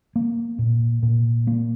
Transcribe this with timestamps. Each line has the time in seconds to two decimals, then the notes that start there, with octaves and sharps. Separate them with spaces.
0.16 A#3
0.59 A#2
1.03 A#2
1.47 A#3